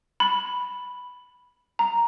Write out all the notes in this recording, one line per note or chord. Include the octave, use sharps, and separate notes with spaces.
B5
A#5